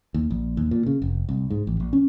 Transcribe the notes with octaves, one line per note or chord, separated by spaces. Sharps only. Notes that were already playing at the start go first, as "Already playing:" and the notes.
D#2
A#1
D#2
A#2
C#3
F1
C2
G#2
A1
A#1
C#4